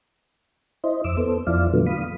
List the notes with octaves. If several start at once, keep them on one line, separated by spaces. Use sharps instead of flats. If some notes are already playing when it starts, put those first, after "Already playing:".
E4 C5 D#5
F2 D6 E6
B3 A4 C5
F2 F3 E4 D5 F5
A#2 D3 F3 F#3 A3 B3
F5 B5 D#6